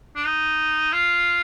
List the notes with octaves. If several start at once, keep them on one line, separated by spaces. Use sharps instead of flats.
D4
D#4
F4